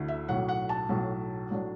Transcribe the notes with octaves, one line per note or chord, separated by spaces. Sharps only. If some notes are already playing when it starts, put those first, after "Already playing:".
Already playing: D2 D3 A3 E4
E5
B1 A2 F#3 F#5
F#5
A5
B1 A2 F#3
A2 F#3 D4